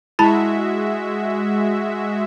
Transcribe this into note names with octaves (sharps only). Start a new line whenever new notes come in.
G#3 E4 F#4 E5 A5 B5